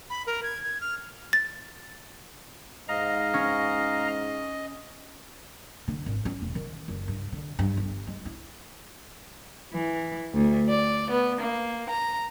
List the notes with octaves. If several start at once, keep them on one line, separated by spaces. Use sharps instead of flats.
B5
A#4
G#6
G#6
F6
A6
G#2 D#5 F5 A#5
C#4
D3
G#1
C#4
E1
D#3
F#1
G2
D3
G2
G1
G#3
E4
E3
D2
D5
B3
A#3
A#5